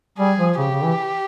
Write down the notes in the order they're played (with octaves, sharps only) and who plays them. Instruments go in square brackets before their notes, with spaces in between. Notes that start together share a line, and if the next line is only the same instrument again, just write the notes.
[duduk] G3 [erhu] G#4
[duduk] F3
[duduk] C#3 [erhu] G4
[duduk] C#3
E3